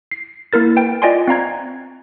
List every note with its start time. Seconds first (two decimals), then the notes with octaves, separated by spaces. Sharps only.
0.11 C7
0.53 A#3 E4 A#4 A6
0.76 B4 G5
1.02 F4 D5 D#5 G5 G#5 C6
1.27 C4 F5 A#5 G#6